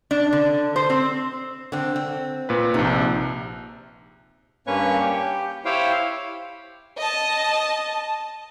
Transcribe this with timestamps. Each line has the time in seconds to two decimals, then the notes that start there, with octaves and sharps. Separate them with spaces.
0.11 D4
0.33 D3
0.76 C5
0.90 C4
1.72 D3 C4
1.96 C4
2.49 A#2 B4
2.74 A#1 C3 D#4
4.67 G2 A#3 C#4 B4 C#5 C#6
5.01 G4
5.65 E4 G4 C5 C#5 F5 G5
6.98 D#5 A5